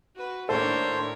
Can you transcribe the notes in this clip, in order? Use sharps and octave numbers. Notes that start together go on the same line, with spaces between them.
F#4 B4
D#2 A2 D4 A4 A#4 C5 C#5